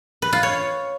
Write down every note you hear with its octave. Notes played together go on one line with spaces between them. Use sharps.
B4
F4
C#5